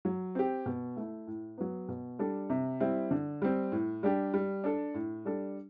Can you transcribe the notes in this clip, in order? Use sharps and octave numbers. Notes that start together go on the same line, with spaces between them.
F#3
C4 G4
B2
A3 E4
A2
F#3 B3
B2
G3 D4 A4
C3
G3 C4 E4
D3
G3 C4
A2
G3 D4 G4
G3
D4 A4
A2
G3 D4 A4